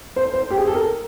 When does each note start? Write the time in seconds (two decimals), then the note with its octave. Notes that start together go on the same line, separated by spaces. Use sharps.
0.16 C5
0.34 C5
0.50 G4
0.58 G#4
0.67 A4
0.75 A#4